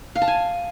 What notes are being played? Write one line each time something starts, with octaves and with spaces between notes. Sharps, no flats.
F5
A5
G#5